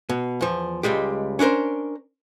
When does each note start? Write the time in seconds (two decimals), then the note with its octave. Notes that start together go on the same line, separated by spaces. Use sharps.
0.09 B2
0.41 E2 F3
0.83 C#2 G3 G#3 G4
1.39 C#4 D4 E4 A#4 C5